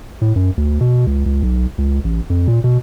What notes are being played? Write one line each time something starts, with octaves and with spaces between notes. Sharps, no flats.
A2
F#2
D2
B2
C#2
C#2
B1
C#2
A1
F2
A#2
B2